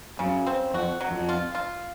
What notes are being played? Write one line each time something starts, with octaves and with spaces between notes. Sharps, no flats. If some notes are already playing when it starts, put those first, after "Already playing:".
F#2 C#3
C4
F2 F#4
F#3
F2
F4
F4